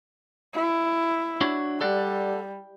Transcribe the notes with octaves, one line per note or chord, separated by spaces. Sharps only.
E4
D4 F#4 C#5
G3 A4 D5 F#5